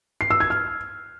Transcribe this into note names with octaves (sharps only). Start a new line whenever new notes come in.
C7
E6
G#6
F6